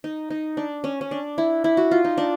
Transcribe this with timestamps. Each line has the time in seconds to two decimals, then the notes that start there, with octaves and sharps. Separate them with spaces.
0.04 D#4
0.30 D#4
0.57 D4
0.84 C#4
1.01 C#4
1.11 D4
1.38 E4
1.64 E4
1.77 F#4
1.91 F4
2.05 D#4
2.17 D4